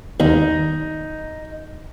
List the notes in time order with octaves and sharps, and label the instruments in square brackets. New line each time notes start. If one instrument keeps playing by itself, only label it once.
[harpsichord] D#2 [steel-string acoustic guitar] D#4